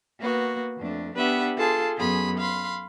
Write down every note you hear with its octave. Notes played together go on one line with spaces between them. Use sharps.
A#3 B3 F#4
F2 A3 D4
B3 D4 G4 B4 E5 F#5
F4 G#4 A4 A5 C6
F#2 B3 G#4 B5 C6
F5 B5 C6